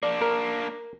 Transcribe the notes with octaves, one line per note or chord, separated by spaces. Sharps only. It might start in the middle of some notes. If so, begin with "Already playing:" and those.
A#3 D4 D5
A#4